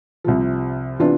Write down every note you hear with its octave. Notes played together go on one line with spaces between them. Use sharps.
C2 C3 F3
C3 E3 B3 D4 F4